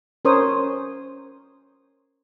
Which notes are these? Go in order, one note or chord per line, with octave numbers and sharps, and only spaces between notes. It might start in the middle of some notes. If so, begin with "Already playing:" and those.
C#4 A#4 C5 C#5 D#6